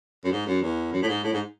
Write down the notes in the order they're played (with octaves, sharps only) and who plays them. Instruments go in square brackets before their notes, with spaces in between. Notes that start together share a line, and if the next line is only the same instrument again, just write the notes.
[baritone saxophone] F#2
G#2
F#2
E2
F#2
A2
G#2
A2
G#2